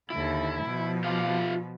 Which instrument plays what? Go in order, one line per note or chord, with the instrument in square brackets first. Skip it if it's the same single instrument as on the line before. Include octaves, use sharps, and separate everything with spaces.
[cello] D#2 D3 [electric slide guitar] E4
[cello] B2 F3
[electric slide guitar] F4 G4 F5